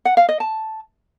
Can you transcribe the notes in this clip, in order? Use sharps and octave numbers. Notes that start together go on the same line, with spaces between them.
F#5
F5
D#5
A5